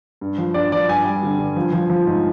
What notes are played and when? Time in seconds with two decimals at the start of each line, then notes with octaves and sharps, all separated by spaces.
0.21 G2
0.38 F3
0.54 G2 D5
0.72 F3 D5
0.89 G2 G#5
1.05 G3
1.23 D3
1.39 G2
1.56 F3
1.73 F3
1.90 F3
2.07 G#2